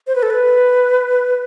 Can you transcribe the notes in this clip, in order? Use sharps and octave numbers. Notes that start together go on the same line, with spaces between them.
C5
B4
A4
B4